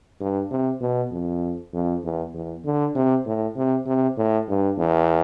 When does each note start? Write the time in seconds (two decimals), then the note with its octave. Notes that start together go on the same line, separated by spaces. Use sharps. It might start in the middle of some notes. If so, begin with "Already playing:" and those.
0.20 G2
0.51 C3
0.81 B2
1.12 F2
1.73 F2
2.04 E2
2.34 E2
2.65 D3
2.95 C3
3.26 A2
3.56 C3
3.86 C3
4.17 A2
4.49 G2
4.78 E2